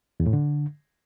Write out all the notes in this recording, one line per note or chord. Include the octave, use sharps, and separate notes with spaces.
E2
A2
D3